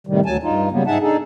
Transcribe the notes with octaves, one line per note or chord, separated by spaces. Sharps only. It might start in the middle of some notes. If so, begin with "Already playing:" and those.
A2 C3 D#3 G3
D2 F#3 G#5 A5
G2 D#4 F4
C#3 F#3 G3 A#3 B3
G#2 D#4 G#4 E5 F#5 A5
D4 D#4 G#4 A4